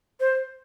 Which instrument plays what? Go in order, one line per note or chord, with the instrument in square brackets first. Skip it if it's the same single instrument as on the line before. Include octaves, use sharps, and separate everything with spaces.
[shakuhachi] C5